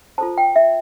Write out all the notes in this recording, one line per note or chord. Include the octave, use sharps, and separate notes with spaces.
F4 A4 C5 A5
G5
E5